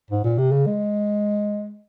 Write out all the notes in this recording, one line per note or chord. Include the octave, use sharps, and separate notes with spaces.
G#2
A#2
C3
C#3
G#3